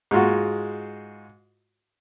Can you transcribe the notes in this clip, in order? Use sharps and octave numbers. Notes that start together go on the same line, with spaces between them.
G#2 G#3 F4 F#4